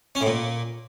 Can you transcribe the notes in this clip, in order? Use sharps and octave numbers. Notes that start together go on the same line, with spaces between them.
C#4
A2
A#2